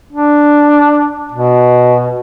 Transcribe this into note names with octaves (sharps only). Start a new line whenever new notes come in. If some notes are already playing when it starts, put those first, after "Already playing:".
D4
B2